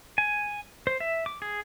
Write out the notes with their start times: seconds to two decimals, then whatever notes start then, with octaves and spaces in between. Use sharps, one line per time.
0.18 G#5
0.87 C5
1.00 E5
1.26 D6
1.42 G#4